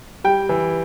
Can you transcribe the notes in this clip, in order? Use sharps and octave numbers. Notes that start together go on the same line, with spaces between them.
G3 G5
E3